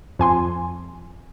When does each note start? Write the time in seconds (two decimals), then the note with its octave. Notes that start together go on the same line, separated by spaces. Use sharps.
0.19 F2 G#5 C6